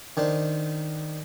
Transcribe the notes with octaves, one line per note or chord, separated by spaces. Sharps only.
D#3 D4 C5